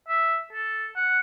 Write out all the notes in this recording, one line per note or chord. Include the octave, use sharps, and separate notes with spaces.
E5
A4
F#5